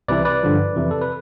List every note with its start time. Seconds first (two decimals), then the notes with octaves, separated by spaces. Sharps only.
0.08 C2 C3 E3 B4 D5
0.25 B4 D5
0.43 G2 D3 F3
0.76 F2 C3 E3
0.91 A4
1.01 B4